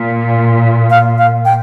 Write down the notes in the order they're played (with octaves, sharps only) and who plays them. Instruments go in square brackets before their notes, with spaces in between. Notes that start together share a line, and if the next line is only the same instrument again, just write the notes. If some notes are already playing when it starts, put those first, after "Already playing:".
Already playing: [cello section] A#2
[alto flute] F5
F5
G5